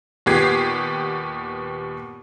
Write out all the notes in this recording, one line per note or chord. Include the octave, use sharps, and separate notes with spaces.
D#2 A#2 B3 G4 G#6 C7